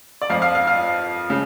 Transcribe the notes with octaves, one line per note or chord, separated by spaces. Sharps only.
D5
F2 F3 F5
F5
F5
F5
C#3